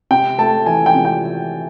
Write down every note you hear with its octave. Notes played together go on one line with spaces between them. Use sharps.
C3 G5
A3 A5
E3 G#5
G5
C3
G5